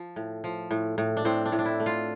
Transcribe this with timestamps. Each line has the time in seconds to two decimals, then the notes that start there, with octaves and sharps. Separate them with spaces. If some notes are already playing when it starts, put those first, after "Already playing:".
Already playing: F3
0.16 A2
0.44 F3
0.71 A2
0.98 A2
1.17 D4
1.25 A2 C4
1.46 D4
1.52 A2
1.59 D4
1.65 E4
1.80 A3
1.86 F4